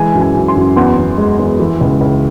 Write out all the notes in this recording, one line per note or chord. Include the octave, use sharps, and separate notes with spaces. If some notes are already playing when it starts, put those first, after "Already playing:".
Already playing: E3 G#3 G#5
F#2
G#5
F#2
C6
F#2
E2 C6
E2
G#3
E2
E3
C#2
C#2